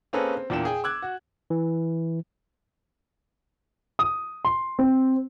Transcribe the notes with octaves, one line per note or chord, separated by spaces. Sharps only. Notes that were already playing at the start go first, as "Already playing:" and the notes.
A#3 C4 C#4 G#4 A4 B4
C4
E2 A#2 D4 G5 E7
G#4 G5
D6 E6 F#6 G#6
F#4
E3
D#6
C6
C4